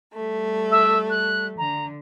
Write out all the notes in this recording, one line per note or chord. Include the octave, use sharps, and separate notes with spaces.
G3 A3
E5
F#6
D3 A#5